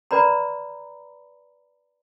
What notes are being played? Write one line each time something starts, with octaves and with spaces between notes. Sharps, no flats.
B4 D5 A#5 B5